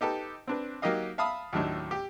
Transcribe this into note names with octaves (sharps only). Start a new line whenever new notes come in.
D#4 G4 A4 B4
C4 D4 B4
F#3 A#3 D#4 G4 D#5 F5
E5 F5 A5 B5 D#6
D#2 A2 F#3 D4 D#4
G4